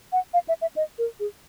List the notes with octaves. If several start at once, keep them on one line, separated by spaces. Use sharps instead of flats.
F#5
F5
E5
E5
D#5
A#4
G#4